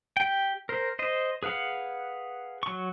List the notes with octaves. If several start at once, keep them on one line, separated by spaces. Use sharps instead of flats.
G4 G5
A#4 C5
C5 D#5
G#4 B4 F5 F#5
F#3 C#6